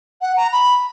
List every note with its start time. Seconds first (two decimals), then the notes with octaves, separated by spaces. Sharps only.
0.21 F#5
0.37 A#5
0.52 B5